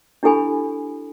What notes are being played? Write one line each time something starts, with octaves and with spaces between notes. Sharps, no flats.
D4 E4 G4 A4 G#5 B5